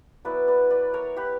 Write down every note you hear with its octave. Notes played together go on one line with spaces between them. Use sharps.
F#3 B3 E4 B4 D5
B4 D5
B4 D5
A#4 C#5
G4 B4